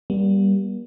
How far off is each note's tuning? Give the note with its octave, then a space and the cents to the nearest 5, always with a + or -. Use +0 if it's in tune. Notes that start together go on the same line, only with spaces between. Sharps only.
G3 +0 A#3 +45